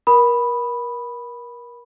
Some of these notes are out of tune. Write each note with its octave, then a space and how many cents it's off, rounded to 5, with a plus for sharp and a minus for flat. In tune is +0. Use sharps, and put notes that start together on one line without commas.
A#4 +30 B5 -5 D#6 +0